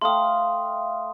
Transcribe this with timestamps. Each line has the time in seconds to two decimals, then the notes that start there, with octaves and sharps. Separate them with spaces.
0.01 A3 F5 G5 C6 D#6